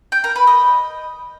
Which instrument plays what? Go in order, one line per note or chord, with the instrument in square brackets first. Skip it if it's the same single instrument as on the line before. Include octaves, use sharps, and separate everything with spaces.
[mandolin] G5
A#4
B4
D#5